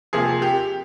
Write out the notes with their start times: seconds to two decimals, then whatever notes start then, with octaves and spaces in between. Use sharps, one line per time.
0.13 C3 F3 A#3 G#4
0.42 G4